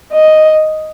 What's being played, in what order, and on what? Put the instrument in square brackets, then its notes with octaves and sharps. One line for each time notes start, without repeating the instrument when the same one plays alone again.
[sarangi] D#5